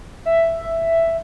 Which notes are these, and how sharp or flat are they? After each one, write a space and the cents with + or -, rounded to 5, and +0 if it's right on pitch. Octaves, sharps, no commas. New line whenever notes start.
E5 +5